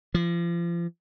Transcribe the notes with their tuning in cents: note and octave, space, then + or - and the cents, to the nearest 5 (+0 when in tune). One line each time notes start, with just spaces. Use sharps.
F3 -35